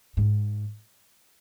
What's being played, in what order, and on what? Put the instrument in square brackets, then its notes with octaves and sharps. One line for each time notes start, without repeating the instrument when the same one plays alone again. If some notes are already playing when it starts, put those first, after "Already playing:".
[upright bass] G#2